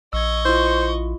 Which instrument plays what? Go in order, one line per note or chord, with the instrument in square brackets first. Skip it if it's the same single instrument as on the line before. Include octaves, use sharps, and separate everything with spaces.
[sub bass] A#1 [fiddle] D#5 C#6 [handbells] E6 G#6
[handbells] E4 F4 [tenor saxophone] C5